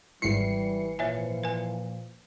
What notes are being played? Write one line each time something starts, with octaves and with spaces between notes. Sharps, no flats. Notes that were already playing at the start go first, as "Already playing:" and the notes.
G#1 E3 G3 E4 C7 C#7
A#2 E3 F3 C#5 E5 G#5
B4 G#5